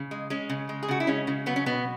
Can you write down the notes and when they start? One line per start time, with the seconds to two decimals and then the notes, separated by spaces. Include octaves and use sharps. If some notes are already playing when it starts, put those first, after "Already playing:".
Already playing: C#3
0.11 G#3
0.30 G#3 C#4
0.49 C#3
0.69 G#3
0.83 G#4
0.88 C#3 F#4
1.00 E4
1.07 G#3 C#4
1.27 C#3
1.46 F#3 B3
1.56 C#4
1.66 B2 B3